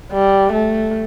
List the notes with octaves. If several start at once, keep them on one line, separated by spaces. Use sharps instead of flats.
G3
A3